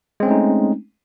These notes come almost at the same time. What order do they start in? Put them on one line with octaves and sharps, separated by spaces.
G#3 C4 C#4 A3 D#4